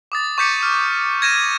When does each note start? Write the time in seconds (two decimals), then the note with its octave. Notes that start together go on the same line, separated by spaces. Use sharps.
0.12 D6 D#6 A6
0.38 C#6 D6 G6 B6 C#7 D#7
0.63 F6
1.22 G#6 A#6 D#7 E7